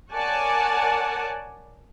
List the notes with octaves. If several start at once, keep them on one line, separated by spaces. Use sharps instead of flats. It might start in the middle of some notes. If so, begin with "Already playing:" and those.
A#4 C#5 D5 F#5 G#5 A5